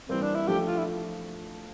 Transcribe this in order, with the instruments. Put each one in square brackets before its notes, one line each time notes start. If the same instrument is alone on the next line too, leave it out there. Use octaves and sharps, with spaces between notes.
[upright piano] E3 G3 A#3 [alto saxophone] C4
[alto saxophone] D4
E4
[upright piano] F3 A3 D4 [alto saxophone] G4
[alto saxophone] F4
E4